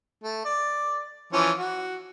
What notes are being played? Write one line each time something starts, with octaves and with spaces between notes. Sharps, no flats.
A3
D5
E3 F3 C#4
F#4